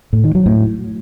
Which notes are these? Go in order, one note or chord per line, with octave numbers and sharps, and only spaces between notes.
A2
D#3
F#3
A2